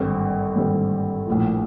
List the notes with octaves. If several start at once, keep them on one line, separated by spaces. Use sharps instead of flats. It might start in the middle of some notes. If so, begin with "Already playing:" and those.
Already playing: G#1 G2 D3 G3 C4
G#1 G2 D3 G3 C4
A#1 A2 F3